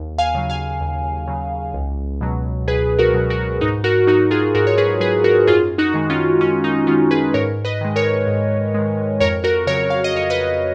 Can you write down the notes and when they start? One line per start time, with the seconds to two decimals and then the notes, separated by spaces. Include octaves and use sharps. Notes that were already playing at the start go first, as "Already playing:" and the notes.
Already playing: D#2
0.18 F5 G#5
0.35 C#3 F#3
0.50 F5 G#5
0.81 D#2
1.28 C#3 F#3
1.74 C#2
2.21 B2 F#3
2.68 C#2 G#4 B4
2.99 F#4 A#4
3.14 B2 F#3
3.30 F#4 A#4
3.61 G#2 D#4 F#4
3.84 F#4 A#4
4.07 F#3 D#4 F#4
4.31 F4 G#4
4.55 G#2 F#4 A#4
4.67 C#5
4.78 G#4 B4
5.00 F#3 G#4 B4
5.24 F#4 A#4
5.47 F#2 F4 G#4
5.78 D#4 F#4
5.94 D#3 G#3
6.10 C#4 F4
6.41 F#2 C#4
6.64 D#4
6.87 D#3 G#3 C#4 F4
7.11 G#4 B4
7.34 G#2 A#4 C#5
7.65 B4 D#5
7.81 D#3 G#3
7.96 A#4 C#5
8.27 G#2
8.74 D#3 G#3
9.20 F2 A#4 C#5
9.44 F#4 A#4
9.67 C#3 F#3 A#4 C#5
9.90 F5
10.04 D#5
10.14 F2 C#5
10.30 B4 D#5